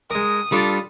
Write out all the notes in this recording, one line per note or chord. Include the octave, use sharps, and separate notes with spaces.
G#3 A#4 D#6
G3 D4 F4 A4 D6